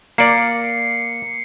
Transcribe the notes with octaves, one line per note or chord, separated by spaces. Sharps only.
A#3 D5 C7 C#7